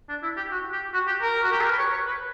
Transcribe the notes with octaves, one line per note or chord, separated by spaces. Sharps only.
D4
E4
G4
F#4
G4
F#4
G4
A#4
F#4
G4
A#4
B4
C#5
C#5
B4